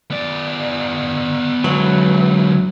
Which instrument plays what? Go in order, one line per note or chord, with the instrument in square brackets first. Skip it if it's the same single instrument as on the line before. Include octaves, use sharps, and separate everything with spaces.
[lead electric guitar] B3 D5
[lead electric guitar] D3 G#3 [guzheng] E3 [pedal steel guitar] F#3